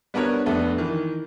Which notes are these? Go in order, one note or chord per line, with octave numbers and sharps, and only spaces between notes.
G3 B3 D4 A#4 C#5
F1 A3 B3 D4
D#3 E3